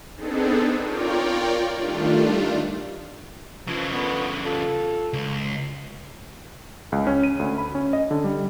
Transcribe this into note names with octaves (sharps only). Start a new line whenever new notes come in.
B3 C4 D4 D#4 G#4 A4
F4 A#4 C#5 D5 G5
D#3 G3 A3 D4 F4
C#3 E3 F3
A#2 D3 B3
F4 A4
C#2
C#2
C#4
D#7
D2
B5
C#4
D#5
D3
G3